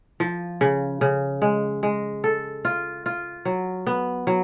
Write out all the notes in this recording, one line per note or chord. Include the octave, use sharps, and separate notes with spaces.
F3
C#3
C#3
G#3
G#3
A4
F4
F4
F#3
B3
F#3